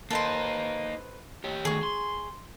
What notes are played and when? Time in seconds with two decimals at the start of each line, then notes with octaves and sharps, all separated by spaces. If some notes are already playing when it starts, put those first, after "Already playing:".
0.11 A#3 D#4 A4 B4 C5
1.44 G4 C#5
1.65 D#3 A3 G#4 C#6
1.83 C6